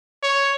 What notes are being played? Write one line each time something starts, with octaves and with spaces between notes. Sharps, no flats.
C#5